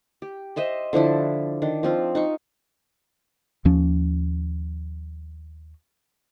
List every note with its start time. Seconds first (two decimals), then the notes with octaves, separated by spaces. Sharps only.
0.22 G4
0.56 C5 D#5 E5 C6
0.93 D3 F3 D4 E4
1.62 D#3 D4
1.83 F3 C4 F4
2.15 D#4 F5 C#6
3.65 D#2 F3 C#4